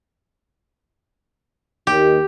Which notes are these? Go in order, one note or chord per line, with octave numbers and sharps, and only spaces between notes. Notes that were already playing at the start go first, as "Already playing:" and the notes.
D#2 G4